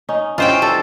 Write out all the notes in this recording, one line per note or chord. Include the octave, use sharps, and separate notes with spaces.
C#4 D#4
E3 C#4 D#4 F4 C5 C#5 G5
G3 A4